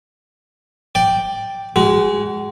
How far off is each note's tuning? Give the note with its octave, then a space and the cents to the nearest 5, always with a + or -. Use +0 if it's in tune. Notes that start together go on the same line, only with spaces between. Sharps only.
D5 +0 G5 +0
G#3 -5 F#4 +30